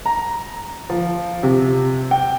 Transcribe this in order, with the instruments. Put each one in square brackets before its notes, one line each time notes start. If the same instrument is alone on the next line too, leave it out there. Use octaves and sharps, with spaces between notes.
[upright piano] A#5
F3
C3
G5